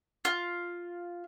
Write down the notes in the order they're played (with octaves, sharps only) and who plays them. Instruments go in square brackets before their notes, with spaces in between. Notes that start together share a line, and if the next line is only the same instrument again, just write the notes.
[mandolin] F4